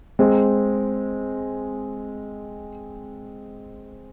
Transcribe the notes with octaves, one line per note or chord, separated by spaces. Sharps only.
G#3 C4